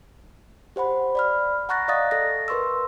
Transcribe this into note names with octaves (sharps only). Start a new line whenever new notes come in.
G4 C5 F#5 B5
D5 B5 F6
F#5 A#5 C#6 F#6 A6 A#6
D5 D#5 F5 D#6 A6
A4 A#6
A#4 B4 C6 C#6 E6